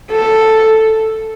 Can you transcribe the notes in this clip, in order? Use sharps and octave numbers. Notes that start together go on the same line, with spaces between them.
A4